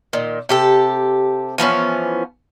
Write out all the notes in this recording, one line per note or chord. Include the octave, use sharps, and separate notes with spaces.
A#2 D#3
C3 G4 A4
E3 F3 B3 C#4